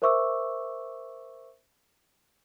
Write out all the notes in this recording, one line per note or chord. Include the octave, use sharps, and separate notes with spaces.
A#4 C5 E5 C#6 D6 E6